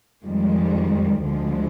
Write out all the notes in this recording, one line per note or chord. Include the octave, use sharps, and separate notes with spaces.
F2 D#3 G3 G#3
D2 D3 F3 G#3